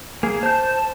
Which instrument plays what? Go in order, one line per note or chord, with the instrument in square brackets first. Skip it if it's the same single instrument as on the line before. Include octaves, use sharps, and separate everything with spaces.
[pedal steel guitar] A#3 G#4
[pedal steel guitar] C5 G6 [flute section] A5